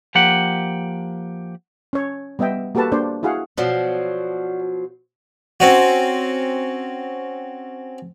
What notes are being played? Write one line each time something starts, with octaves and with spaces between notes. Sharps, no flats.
F3 A#3 G4 F#5
C#4 C#5
G3 B3 D#5 E5 G5
A#3 F#4 G4 A4 B4 A5
A#3 D4 C5 D5
E4 F#4 G#4 F5 F#5
B2 F3 F#3 F#4 C5 D5
C4 C#4 F#4